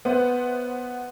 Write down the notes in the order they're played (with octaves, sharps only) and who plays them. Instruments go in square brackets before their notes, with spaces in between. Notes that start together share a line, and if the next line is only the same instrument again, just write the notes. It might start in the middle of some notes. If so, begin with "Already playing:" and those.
[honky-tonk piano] B3 C5 E5 F#5